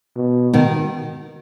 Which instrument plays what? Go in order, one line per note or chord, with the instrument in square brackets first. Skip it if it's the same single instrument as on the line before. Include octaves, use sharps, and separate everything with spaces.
[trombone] B2
[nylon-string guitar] B2 D#3